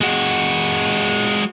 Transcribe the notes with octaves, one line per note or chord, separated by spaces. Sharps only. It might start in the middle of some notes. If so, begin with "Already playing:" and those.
G#3 F#4